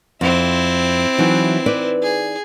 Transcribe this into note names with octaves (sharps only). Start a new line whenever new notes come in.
F2 C4 E4
E3 F#3 D#4
D#4 B4 D5
G#4